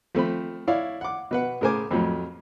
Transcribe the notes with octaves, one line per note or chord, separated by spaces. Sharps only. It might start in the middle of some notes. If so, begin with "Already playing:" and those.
F3 A3 C4 B5
E4 C#5 D5 F5
F#5 D6
B2 B4 F#5
A2 C#3 A#4 C5 G#5 D6
F2 A2 F3 F#3